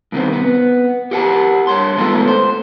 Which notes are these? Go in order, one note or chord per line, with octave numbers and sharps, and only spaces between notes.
G2 C3 D#3 B3 C4
B3
G4 A#4 F#5 G5 A5
G2 C#5 C6
G#3 A3 B3 D#4 F4 A4
C5